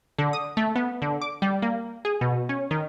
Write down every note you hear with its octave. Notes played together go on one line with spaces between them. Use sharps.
D3
D#6
A3
B3
D3
D6
G3
A#3
G#4
B2
C#4
D#3